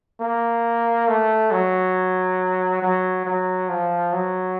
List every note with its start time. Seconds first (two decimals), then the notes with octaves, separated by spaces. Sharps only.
0.20 A#3
1.08 A3
1.51 F#3
2.82 F#3
3.25 F#3
3.69 F3
4.13 F#3